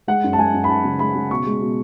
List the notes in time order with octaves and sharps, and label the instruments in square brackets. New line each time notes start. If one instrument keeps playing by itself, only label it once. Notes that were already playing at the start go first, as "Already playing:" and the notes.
[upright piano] G#3 F#5
F#2
A5
G#3 G#5
F#2
B5
F#2 A5
C#3
G#3 B5
C#3
B2 C#6
G#3
B2